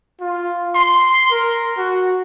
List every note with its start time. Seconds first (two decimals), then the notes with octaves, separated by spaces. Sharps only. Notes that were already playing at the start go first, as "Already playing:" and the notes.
0.21 F4
0.75 C6
1.32 A#4
1.77 F#4